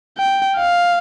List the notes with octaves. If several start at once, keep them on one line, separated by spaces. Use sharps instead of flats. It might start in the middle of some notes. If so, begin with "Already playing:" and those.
G5
F5